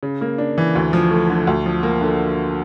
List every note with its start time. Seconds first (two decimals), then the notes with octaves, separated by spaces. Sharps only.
0.03 C#3
0.21 A#3
0.38 D4
0.58 E3
0.75 D2
0.93 F3
1.11 A3
1.30 D3
1.47 D2
1.66 F3
1.83 A#3
2.01 D3